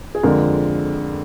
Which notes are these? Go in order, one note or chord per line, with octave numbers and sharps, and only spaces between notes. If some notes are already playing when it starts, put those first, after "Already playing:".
G#4
F2 D3 F3 G#3 A#4